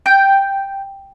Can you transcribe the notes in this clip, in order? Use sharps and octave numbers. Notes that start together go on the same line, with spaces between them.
G5